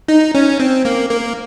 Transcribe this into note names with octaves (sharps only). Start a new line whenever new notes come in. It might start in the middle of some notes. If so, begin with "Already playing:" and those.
D#4
C#4
C4
A#3
A#3